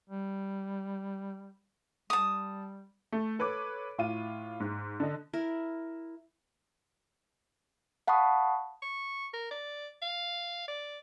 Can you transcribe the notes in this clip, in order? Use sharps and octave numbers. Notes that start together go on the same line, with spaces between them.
G3
G3 A5 D#6
A3
A4 B4 C#5 D6
A2 F4 D#7
G#2
D3 D#5
E4 A#4
F5 F#5 A5 B5 C#6 D#6
C#6
A#4
D5
F5
D5